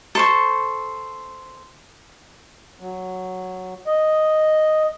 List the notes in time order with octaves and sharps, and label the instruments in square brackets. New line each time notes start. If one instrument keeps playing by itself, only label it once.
[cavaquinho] A4 C5 C#6
[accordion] F#3
D#5